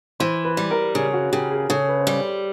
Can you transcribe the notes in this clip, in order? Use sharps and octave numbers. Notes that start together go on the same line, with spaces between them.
E3 C5
B4
G3
A#4
C#3 G#4
F#4
C#3 G4
G#4
C#3 A4
B4
C5
G3 C#5